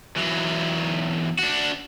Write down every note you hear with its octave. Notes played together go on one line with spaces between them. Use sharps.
E2 F#3
D4 F#4